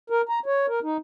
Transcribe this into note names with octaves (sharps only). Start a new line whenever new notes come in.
A#4
A#5
C#5
A#4
D#4